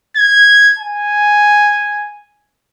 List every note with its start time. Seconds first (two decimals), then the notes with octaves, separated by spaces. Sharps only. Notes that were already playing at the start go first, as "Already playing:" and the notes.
0.16 G#6
0.79 G#5